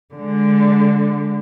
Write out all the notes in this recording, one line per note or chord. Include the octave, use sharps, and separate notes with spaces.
D3 G#3